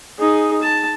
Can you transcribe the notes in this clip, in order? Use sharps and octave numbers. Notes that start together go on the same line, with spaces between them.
D#4 G#4
A5